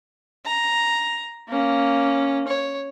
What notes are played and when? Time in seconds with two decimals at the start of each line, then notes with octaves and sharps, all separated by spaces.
0.45 A#5
1.49 A#3 C#4
2.47 C#5